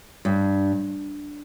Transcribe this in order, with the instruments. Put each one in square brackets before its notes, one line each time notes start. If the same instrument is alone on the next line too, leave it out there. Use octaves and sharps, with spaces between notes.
[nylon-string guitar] G2